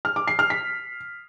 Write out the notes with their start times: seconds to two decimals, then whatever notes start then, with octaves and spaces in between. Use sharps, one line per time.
0.05 F6
0.16 D6
0.28 C7
0.39 F6
0.50 B6